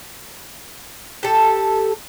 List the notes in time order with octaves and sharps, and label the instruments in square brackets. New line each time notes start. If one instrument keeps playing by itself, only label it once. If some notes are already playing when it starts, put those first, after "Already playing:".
[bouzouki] G4 A4